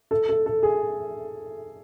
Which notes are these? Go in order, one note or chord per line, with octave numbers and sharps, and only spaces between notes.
A4
A4
A4
G#4